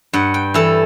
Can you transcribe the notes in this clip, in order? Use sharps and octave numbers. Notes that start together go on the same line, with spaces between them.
G2 F#5
G5
E3 A4